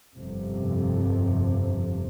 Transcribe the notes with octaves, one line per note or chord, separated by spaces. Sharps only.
G1 F2 C3